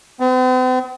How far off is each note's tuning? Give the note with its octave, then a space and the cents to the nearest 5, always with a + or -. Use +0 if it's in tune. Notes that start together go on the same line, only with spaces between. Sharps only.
C4 -45